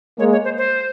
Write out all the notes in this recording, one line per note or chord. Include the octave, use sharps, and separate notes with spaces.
G#3 A#3 C#5
C#5
C5
C5